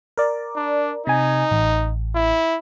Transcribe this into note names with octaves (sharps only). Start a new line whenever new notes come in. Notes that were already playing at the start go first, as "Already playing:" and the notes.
A#4 D5
D4
C3 D#4 G#5
A1
E4